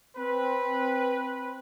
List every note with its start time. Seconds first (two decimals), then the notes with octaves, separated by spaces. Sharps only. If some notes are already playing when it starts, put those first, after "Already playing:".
0.17 C4 B4